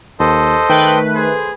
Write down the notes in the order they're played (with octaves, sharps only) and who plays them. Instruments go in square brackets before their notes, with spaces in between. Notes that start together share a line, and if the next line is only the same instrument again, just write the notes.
[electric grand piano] D#2 [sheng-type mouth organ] A4 C5 D#5
[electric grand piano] D#3 [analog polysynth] A3 B4 [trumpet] G5
[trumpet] G#4 [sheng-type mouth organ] C5